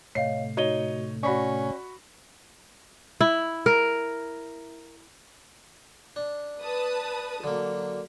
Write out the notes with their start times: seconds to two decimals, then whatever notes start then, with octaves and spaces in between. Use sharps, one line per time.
0.15 A2 C3 A3 C#5 D#5 F5 C7
0.57 D#4 F#4 C#5 D#5 D#7 G7
1.23 C#4 F#4 D5 B5 C#6
3.21 E4
3.66 A#4
6.16 D4
6.61 B4 A5 D#6
7.44 D3 F#3 A#3